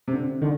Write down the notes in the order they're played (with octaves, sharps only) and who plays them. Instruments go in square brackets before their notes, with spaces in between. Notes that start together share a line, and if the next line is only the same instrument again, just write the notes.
[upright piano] C3
D3
[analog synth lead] D3 [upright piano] D#3